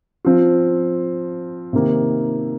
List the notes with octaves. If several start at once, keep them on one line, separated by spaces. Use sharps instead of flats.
F3 C4 F4
C3 D#3 A#3 D#4